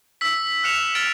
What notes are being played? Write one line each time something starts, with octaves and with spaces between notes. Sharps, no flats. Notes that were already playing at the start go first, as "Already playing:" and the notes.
E6 B6
F6 F#6 C7 C#7 E7 F7
F6 A6 D7